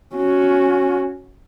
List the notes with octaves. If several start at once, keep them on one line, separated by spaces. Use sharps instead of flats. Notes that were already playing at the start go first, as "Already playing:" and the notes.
C#4 F#4